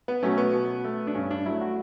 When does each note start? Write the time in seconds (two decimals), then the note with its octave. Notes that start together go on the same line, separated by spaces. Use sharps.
0.08 B3
0.23 B2 F#3 A3 C#4
0.38 B3
0.53 B2
0.84 A3
1.07 D4
1.14 G2 C#4
1.31 D4
1.45 F#3 A3 E4
1.61 F#4